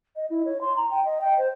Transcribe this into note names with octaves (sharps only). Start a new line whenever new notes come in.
D#5
E4
C#5
C6
A#5
G5
D#5
G5
C5